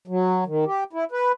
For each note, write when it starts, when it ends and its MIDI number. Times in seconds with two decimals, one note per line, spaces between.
0.08 0.44 54
0.46 0.65 51
0.65 0.84 67
0.93 1.05 64
1.12 1.32 71